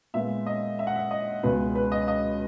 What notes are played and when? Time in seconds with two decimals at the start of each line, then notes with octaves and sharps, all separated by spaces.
0.14 A#2 G#3 B3 E5
0.46 D#5
0.79 E5
0.87 F#5
0.96 E5
1.11 D#5
1.43 C#2 B2 G#3 B3 B4
1.75 B4
1.92 D#5
2.08 D#5